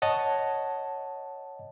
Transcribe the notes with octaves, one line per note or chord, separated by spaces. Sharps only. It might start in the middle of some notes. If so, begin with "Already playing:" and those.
C#5 D#5 F#5 A5